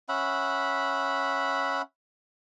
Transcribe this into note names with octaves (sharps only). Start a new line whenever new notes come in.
C#4 E5 F#5 B5